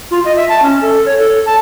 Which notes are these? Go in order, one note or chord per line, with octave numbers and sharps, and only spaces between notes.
F4
D#5
E5
A5
C#4
A4
C#5
A4
A5